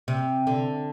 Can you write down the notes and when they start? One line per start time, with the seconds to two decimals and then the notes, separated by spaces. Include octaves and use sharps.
0.08 C3
0.47 D3